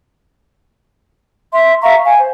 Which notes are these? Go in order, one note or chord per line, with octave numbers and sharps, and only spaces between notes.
E5 C6
E5 F5 A#5 C#6
F5 G#5
C5